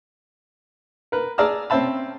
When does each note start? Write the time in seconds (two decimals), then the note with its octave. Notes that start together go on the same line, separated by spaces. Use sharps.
1.12 A#4 B4
1.38 G#4 D5 A5 A#5 E6 F6
1.70 C4 C#4 C5 E5 A5 B5